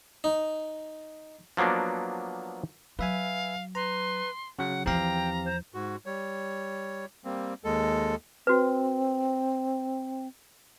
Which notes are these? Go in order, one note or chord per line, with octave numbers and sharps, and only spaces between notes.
D#4
F3 F#3 A#3 B3 D4
F#3 B4 E5 F5 G#5
B4 A#5 C6
C#3 F#3 F#5
E2 F3 C4 G4 F5 G5 A#5
C5
G#2 F#4
G3 C#5
G3 A#3 C4
D#2 G#3 A4
C4 F#4 B4